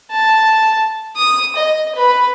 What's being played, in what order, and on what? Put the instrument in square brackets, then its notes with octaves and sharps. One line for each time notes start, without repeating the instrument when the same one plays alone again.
[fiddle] A5
D#6
D#5
B4